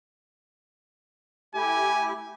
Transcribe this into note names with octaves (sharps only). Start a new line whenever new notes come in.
A3 E4 G4 G#5